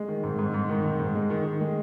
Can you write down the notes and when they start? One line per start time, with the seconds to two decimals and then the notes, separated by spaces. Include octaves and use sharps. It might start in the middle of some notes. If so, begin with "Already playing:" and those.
Already playing: G#3
0.09 D#3
0.24 G#2
0.39 G#2
0.54 G#2
0.69 D#3
0.84 G#2
1.00 G#2
1.15 G#3
1.30 D#3
1.45 D#3
1.61 G#3